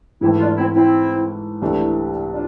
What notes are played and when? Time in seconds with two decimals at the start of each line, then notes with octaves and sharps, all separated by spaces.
0.21 G#2 E3 A3 C4 E4
0.39 D4 F4
0.57 C4 E4
0.74 C4 E4
1.62 C2 C3 E3 A3 D4
2.31 D4 F4